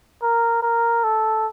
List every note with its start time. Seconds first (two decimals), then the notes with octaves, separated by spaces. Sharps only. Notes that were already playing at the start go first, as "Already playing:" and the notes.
0.22 A#4
0.62 A#4
1.04 A4